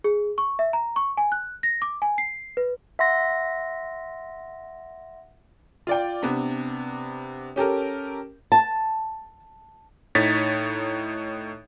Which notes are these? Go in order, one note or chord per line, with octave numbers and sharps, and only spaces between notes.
G#4
C#6
E5
A#5
C#6
G#5
F#6
A#6
D6
G#5
C7
B4
E5 F#5 C6 A#6
F4 D5 G5
C3 B3 D4
C#4 G4 A4 A#4
A5
A2 D#4 C#5 A6 B6